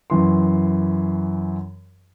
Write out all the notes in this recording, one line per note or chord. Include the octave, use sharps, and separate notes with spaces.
F#2 E3 C6